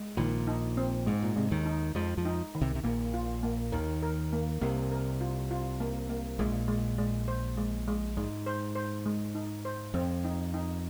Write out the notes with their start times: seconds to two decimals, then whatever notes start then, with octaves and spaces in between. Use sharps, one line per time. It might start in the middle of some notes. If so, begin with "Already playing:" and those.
Already playing: G#3
0.17 A#1 A#2 D#3
0.47 D#4
0.77 C4
1.06 G#2 G#3
1.22 A#2
1.36 C3 G#3
1.51 D#2 D#3
1.66 D#4
1.95 F2 F3 G#3
2.17 F2 F3
2.25 D#4
2.55 D#3
2.61 C2 C3
2.75 C3
2.84 A#1 A#2 A#3
3.14 F4
3.43 A#3
3.72 D#2 D#3 A#4
4.03 A#4
4.33 A#3
4.61 C2 C3 A#3
4.91 A#4
5.21 F4
5.51 F4
5.80 A#3
6.10 A#3
6.39 A#1 A#2 G#3
6.68 G#3
6.98 G#3
7.28 C5
7.57 G#3
7.88 G#3
8.17 G#2 G#3
8.46 C5
8.75 C5
9.06 G#3
9.35 D#4
9.65 C5
9.94 F2 C4
10.24 D#4
10.54 D#4